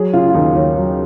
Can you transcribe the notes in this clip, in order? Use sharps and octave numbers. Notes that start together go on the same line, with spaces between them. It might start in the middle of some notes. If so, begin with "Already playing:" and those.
Already playing: F#3 G#4
C#3 F4
F4
D#2 D#4
D#2 C#4
F#3